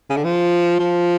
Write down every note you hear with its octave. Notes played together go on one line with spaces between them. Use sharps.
C#3
D3
F3
F3